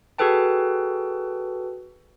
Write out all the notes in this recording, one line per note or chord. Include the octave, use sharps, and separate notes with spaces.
F#4 G#4 A4 B4 G5 A5